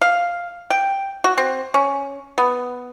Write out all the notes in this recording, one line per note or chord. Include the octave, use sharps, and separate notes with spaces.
F5
G5
F#4
C4
C#4
B3